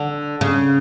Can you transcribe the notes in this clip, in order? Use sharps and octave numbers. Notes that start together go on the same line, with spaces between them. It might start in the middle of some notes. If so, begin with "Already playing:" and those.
Already playing: D3
C#3